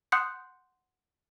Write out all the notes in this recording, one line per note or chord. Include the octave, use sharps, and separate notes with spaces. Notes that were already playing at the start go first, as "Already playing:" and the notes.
F#5 C6 D#6 F#6 G6 C#7